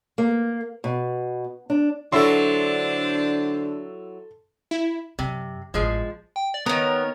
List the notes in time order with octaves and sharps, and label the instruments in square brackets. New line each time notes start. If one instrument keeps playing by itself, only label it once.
[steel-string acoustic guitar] A#3
B2
D4
[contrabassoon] D3 [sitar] F#3 E4 [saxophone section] D4 C5 [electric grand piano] A4 C6
[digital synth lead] E4
[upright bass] F#2 [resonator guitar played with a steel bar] C3
[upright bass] A1 B3 [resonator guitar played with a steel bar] F3 G#3
[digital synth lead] G5
D5
[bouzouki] D#3 A#4 [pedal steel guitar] B3 [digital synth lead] C#5